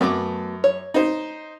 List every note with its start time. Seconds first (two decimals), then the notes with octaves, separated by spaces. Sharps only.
0.01 F#2 F#3 A3 B3 D6
0.64 C#5
0.94 D#4 C5